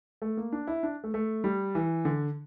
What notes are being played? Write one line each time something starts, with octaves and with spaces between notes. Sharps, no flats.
A3
A#3
D4
E4
D4
A3
A3
G3
E3
D3